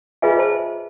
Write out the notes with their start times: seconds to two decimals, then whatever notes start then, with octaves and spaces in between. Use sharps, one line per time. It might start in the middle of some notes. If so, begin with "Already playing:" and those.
0.22 F4 G#4 B4 D#5 E5 G#5
0.39 C5 A5